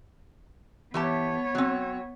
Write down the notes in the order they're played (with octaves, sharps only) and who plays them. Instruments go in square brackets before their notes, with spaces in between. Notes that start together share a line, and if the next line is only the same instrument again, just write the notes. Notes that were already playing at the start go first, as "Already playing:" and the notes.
[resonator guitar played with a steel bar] E3 G4 A5 [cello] B3 C#5
[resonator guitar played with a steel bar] F#3 C4